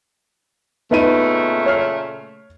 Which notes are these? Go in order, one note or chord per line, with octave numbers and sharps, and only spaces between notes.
A#2 C#3 A3 B3 D#4 D#7
C#5 F6 C7